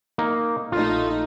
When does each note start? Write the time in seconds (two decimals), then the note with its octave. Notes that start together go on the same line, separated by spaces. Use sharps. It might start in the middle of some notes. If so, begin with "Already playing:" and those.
0.18 A#3 D#4
0.72 A#1 A3 D#4 F4